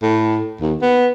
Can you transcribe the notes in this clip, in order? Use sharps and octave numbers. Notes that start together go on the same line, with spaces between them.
A2
D#2
B3